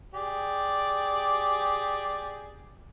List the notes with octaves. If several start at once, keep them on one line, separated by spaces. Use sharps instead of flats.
G4 G#4 D5